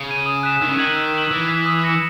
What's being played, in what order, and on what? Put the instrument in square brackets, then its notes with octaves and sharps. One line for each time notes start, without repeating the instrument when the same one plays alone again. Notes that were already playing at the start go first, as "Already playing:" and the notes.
Already playing: [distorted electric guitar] C#3
[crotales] G#6 D#7
D#6
F#6 B6 E7
[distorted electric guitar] D#3 [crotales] E6
[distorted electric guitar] C#3
[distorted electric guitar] D#3 [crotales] G#6 B6 D#7 F#7
[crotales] E6
B6 D#7 F#7
[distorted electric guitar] E3 [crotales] E6
[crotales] G#6 B6
D#6
A#6 C#7 E7